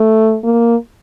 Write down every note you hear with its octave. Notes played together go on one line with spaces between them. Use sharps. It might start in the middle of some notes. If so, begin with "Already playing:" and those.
Already playing: A3
A#3